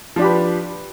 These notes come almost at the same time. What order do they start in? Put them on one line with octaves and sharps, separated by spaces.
F3 D4 G4 B4